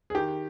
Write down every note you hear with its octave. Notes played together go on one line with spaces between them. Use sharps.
G#4
D#3 G4